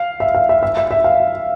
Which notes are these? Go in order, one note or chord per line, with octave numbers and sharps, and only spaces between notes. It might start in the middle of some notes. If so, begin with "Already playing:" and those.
Already playing: F5
E5
F5
E5
E5
E5
E5
F5